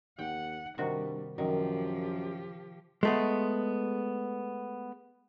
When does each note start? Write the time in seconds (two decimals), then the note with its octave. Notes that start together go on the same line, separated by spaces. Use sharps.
0.19 D#2 F#5 G5
0.78 G2 C3 D#3 G3 F#4
1.38 F#2 D#3 F3 G4
3.03 G#3 A3 B3